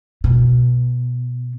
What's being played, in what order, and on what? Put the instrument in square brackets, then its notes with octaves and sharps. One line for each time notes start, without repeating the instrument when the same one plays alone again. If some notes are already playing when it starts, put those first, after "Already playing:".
[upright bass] B2